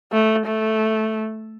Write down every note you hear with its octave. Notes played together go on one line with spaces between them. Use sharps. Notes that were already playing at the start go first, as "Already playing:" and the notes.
A3
A3